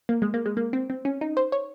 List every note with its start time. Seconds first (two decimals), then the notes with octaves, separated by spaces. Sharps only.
0.09 A#3
0.22 G#3
0.34 A#3
0.46 G#3
0.57 A#3
0.73 C4
0.90 C4
1.05 C#4
1.21 D#4
1.37 C5
1.52 C#5